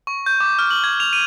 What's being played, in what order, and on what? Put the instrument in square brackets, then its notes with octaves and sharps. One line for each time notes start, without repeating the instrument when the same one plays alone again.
[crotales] C#6
G6
D6
F6
F#7
G#6
F7
D#7